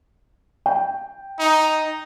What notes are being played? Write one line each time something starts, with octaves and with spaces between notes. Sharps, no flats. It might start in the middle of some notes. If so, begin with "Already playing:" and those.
G5
D#4